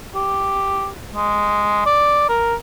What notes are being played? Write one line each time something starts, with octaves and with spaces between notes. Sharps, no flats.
G4
G#3
D5
A#4